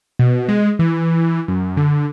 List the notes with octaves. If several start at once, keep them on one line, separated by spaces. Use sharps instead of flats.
B2
G#3
E3
F#2
D3